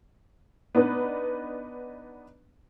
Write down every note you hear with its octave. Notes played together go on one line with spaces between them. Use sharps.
B3 D4 D#4 B4